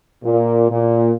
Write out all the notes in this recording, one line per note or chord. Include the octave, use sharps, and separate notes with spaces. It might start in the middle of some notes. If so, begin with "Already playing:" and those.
A#2
A#2